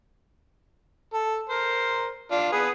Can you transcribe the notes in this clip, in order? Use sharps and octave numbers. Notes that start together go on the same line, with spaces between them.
A4
A#4 C5
D4 F4
B3 G#4 B4